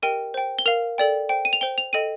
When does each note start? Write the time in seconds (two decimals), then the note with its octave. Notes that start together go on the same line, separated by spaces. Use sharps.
0.02 G4 A#4 D#5 G5 D#7
0.34 C5 G5
0.59 G7
0.66 A#4 F5 F7
0.98 A4 D5 G5
1.29 C5 G5
1.45 D#7
1.53 F7
1.61 C5 G5 G7
1.78 F7
1.93 A4 D#5 G5 D#7